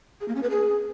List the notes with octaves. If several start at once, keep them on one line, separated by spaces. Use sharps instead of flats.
G#4
A#3
C#4
B4
G#4